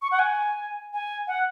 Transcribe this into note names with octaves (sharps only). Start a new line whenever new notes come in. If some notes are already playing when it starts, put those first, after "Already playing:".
C#6
F#5
G#5
G#5
F#5